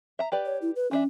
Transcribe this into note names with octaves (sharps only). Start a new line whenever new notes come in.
E5 A#5
G4 B4 D5
C#5
E4
B4
E3 C#4 D4 E5